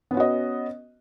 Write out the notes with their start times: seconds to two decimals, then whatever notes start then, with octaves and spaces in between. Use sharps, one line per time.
0.11 B3
0.14 C#4
0.17 F#4
0.20 D#5